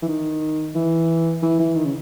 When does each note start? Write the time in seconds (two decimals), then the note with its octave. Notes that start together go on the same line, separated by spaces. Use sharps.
0.02 E3
0.08 D#3
0.75 E3
1.42 E3
1.59 E3
1.76 D#3
1.85 C#3